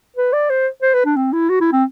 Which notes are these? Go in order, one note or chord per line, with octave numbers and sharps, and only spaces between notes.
B4
D5
C5
C5
B4
D4
C4
E4
F#4
E4
C4